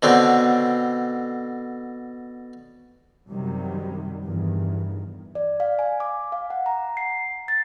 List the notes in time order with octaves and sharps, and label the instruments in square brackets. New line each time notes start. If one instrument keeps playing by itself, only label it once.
[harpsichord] B2 D3 C4
[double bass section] F#2 C3 D#3 F#3 G3
E2 G2 D#3
[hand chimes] D5
F5
G#5
D6
F5
F#5
A#5
C7
A6